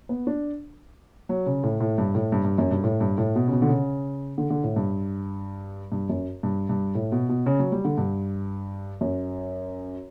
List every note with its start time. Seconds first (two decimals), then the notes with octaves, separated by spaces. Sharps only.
0.09 B3
0.27 D4
1.29 F#3
1.46 C#3
1.63 A2
1.80 A2
1.98 G2
2.15 A2
2.32 G2
2.45 G2
2.58 F#2
2.71 G2
2.84 A2
3.01 G2
3.18 A2
3.36 B2
3.48 C#3
3.53 B2
3.62 D3
3.69 C#3
4.38 D3
4.50 D3
4.64 A2
4.76 G2
5.92 G2
6.09 F#2
6.43 G2
6.69 G2
6.95 A2
7.12 B2
7.29 B2
7.46 C#3
7.59 F#3
7.72 G3
7.85 D3
7.98 G2
9.01 F#2